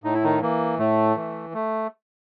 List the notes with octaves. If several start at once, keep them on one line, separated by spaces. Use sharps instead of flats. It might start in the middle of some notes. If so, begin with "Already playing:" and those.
A2 D#4
E4
D#3 D#4
E3 A#3
A2 A3
E3
A3